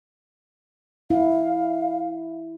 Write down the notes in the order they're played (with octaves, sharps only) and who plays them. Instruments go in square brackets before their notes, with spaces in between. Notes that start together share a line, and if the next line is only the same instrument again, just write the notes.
[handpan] E4 [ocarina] F5